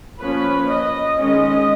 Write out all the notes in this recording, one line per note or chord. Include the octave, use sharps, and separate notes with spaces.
F3 A#3 C#4 B4
D#5
D#3 G#3 C#4 D#5